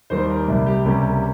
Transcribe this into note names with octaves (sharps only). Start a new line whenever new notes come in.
D#2 D#3 G3 A#3 C5
A#4
C2 C3 G3
G4
C#2 C3 G3 A#3 C#4